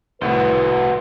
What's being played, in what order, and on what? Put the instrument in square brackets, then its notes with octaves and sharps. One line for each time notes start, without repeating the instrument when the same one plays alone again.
[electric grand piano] C2 A2 [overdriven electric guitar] F#4 C5 [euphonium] B4